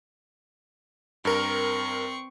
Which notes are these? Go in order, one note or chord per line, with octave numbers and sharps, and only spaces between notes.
G2 C4 A#4 C#6